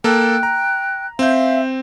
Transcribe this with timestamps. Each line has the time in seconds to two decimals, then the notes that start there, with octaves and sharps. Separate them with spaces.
0.04 A#3 A4 G5 F#6
0.43 A#5
1.19 C4 E5 F5 G6